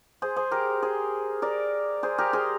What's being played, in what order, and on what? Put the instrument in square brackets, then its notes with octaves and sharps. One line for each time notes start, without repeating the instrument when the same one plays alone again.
[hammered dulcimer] G#4 C5
G#4 C5
G4 A#4
G#4 C5
A#4 D5
G#4 C5
G4 A#4
G#4 C5